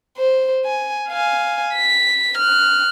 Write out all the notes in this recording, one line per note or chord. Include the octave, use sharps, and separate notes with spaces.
C5
G#5
F5 G#5
B6
F6 F#6